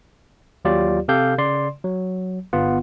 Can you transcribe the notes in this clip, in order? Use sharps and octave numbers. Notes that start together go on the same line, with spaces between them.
D#2 F#3 F4 G4 D5
C3 G4 A4 F5 G6
C#3 D5 C6
F#3
G1 B3 F4 F#5